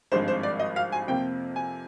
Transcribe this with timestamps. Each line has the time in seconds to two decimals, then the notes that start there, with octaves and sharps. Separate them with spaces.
0.12 G#1 G2 F3 G#3 C4 C5
0.28 C5
0.43 D5
0.59 D#5
0.76 F5
0.92 G#5
1.08 F2 C3 F3 A#3 G5
1.56 G#5